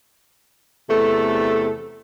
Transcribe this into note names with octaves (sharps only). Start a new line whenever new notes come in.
E2 C3 A3 A4